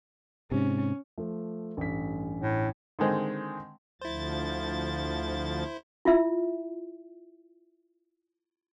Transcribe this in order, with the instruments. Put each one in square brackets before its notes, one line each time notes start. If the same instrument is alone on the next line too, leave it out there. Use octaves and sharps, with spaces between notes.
[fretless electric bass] G#2 C3 [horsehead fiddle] C#4
[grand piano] F3 A3
A1 G2 B6
[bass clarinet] A2
[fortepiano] D3 D#3 G#3 C4
[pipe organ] D2 F3 A6 [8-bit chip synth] E4 C5
[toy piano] E4 F4 E5